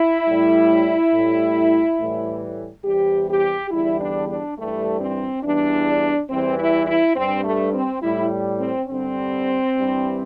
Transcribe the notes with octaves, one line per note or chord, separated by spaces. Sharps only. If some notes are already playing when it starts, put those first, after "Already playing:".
Already playing: E4
A2 G3
A2 G3
A2 E3 G3
E2 C3 G3 G4
G4
E2 D3 G3 E4
D4
D4
G2 E3 G3 A3
C4
E2 E3 G3 D4
E2 E3 G3 C4
E4
E4
G2 G3 C4
A3
C4
A2 G3 E4
C4
G2 D3 G3 C4
G2 E3 G3